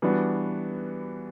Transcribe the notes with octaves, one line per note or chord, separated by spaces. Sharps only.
E3 G3 B3 D4 F#4